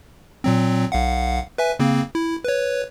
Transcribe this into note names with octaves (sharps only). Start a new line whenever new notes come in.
A#2 F#3 C4
B1 F5 F#5
B4 E5 G#5
C#3 A#3 C4
E4
B4 C#5